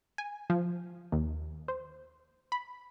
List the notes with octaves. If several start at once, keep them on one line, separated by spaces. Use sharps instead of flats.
G#5
F3
D#2
C5
B5